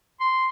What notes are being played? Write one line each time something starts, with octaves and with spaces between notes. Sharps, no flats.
C6